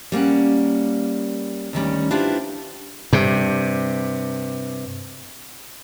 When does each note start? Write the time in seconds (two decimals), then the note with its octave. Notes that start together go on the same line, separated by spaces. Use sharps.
0.12 G3 A#3 C#4 F#5
1.73 D2 D#3 G3 C#4
2.11 D4 E4 F4 G4 B4 C5
3.13 G2 C3